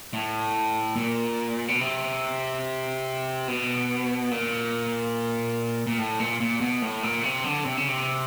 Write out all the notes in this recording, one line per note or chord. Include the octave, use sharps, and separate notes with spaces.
A2
A#2
B2
C3
B2
A#2
A#2
A2
A#2
A#2
B2
A2
A#2
C3
D3
C3
C#3
C3